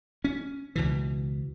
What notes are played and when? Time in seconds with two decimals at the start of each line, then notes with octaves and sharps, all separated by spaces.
0.24 C#4
0.76 C#2 B2 E3